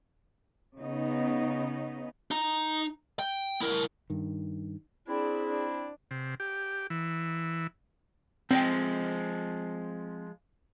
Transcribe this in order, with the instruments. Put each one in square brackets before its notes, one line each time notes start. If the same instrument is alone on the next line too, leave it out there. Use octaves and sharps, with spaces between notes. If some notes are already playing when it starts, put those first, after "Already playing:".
[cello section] C#3 B3 D#4
[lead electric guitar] D#4 A#5
G5
E4 A#4
[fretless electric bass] G2 D#3
[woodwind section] C4 E4 [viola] D4 [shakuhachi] G#4
[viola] D4
[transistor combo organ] C3
G4
E3
[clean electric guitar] F3 G#3 [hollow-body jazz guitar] C4 D#5 G5